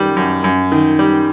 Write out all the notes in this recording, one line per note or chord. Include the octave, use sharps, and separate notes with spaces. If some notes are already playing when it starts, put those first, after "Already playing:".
Already playing: F#2 D#3 G3
F#2
F#2
D#3
G3